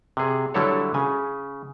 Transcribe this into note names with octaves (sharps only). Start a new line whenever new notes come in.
C3 G#4
D3 F#3 G3 E4 A4 C#5
C#3 G#5